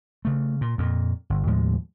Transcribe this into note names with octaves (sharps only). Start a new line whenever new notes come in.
C#3 A3
A#2
F2 A#2
G1
D#2 A2 F3 G#3